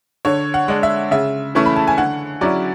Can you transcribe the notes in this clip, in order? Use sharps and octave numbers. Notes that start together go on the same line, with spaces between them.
D3 C#5
F#5
G#3 D4
E5
C#3 E5
E3 A3 C#4 E4 C#6
B5
A5
G#5
D3 F#5
F#3 C#4 E4 D5